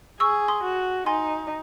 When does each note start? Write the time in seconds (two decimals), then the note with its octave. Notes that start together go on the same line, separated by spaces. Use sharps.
0.20 G#4 C#6 E6
0.48 C6 D#6
0.64 F#4
1.06 D#4 G#5 C6